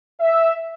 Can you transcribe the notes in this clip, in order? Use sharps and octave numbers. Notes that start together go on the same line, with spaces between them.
E5